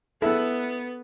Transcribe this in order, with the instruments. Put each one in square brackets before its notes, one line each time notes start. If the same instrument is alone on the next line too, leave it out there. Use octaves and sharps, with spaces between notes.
[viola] B3 [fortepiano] E4 E5 [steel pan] A4